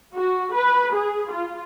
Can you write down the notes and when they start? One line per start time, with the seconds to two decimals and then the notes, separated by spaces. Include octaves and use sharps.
0.15 F#4
0.54 B4
0.94 G#4
1.32 F4